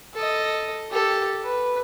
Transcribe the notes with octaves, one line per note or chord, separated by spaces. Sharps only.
A4 D#5
G4 A4
B4